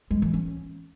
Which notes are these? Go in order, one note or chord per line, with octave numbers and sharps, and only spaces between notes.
G#3
E3
C#4